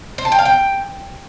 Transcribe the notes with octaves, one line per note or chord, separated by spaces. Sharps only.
C5
A5
G5
F5
G5